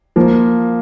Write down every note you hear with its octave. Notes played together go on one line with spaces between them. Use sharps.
F3 A#3